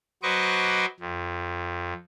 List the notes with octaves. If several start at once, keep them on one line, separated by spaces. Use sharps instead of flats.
F#3 B4 C5 D#5 C#6 D6
F2